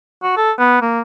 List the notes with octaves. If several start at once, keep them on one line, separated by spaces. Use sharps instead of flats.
F#4
A4
B3
A#3